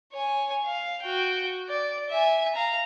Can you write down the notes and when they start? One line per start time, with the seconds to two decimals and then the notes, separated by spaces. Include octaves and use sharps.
0.13 C#5 G#5
0.66 F5
1.03 F#4 G5
1.69 D5
2.09 E5 G#5
2.55 F5 A#5